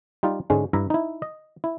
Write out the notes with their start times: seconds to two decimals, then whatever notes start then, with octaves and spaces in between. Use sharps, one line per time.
0.23 G3 D#4 F4
0.50 G#2 D3 G#3 C#4
0.73 G2 E4 E5 A#5
0.90 D#4 E4
1.22 D#5
1.64 E4